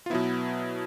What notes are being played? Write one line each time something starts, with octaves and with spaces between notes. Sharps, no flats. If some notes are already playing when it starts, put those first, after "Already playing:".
F4
B2 F#3 B3 E4